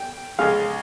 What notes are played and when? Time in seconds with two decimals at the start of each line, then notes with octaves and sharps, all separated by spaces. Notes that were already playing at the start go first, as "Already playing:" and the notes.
Already playing: G5
0.39 C#2 C#3 G#3 F5